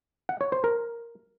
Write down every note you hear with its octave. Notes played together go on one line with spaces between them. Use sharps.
F#5
C#5
C5
A#4